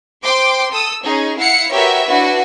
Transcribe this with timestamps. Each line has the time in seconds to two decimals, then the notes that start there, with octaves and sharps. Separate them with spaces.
0.24 C5 G5 C6 D6
0.71 A4 D#6 E6
1.04 C#4 D#4 G#4
1.38 E4 F5 F#5 C7 C#7
1.70 F#4 G4 A#4 B4 C#5 E5
2.06 D4 E4 F#4 B4